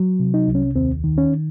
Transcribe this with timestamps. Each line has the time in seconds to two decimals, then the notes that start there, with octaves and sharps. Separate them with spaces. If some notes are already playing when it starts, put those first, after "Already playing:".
Already playing: F#3
0.20 C3
0.34 D#4
0.48 C2
0.55 C#4
0.76 D#2 C4
1.04 D#3
1.18 C#4